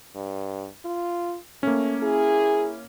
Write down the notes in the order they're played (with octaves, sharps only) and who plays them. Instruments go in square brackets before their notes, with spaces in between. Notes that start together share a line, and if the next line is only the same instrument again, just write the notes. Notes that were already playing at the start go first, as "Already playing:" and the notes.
[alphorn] G2
F4
[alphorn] A3 [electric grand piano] A#3 C#4
[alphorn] E4 [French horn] G#4